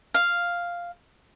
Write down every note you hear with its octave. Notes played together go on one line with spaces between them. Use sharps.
F5